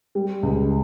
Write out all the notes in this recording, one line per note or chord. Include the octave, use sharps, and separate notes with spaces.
G3
C#2